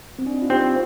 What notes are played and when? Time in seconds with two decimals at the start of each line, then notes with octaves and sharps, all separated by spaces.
0.19 C4
0.26 D4
0.34 D#4
0.42 F4
0.50 C4 G4